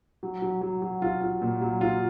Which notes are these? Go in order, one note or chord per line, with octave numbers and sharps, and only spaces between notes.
F#3
F#3
F#3
F#3
F4
F4
A#2
F#3
F4